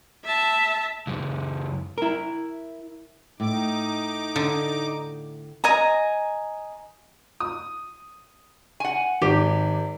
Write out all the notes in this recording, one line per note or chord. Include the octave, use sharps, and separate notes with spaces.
E5 A5
C#2 F#2
E4 A#4
A2 D#4 D6
D3
D#5 G#5 A#5
D#6
F#5 G#5
G#1 G4